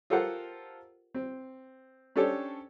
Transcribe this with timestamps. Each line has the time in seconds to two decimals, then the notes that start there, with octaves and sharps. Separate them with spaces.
0.10 F4 G4 A4 A#4 C5 F#5
1.14 C4
2.16 C#4 D4 G4 A4 C5 C#5